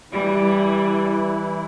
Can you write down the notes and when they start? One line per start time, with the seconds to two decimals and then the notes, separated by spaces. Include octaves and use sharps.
0.12 E3 G3 E4